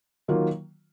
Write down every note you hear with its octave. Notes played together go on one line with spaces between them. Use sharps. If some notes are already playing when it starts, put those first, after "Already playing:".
D#3 F#3 A#3 F4